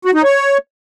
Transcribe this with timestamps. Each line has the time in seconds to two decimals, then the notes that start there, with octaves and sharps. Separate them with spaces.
0.05 F#4
0.14 D#4
0.24 C#5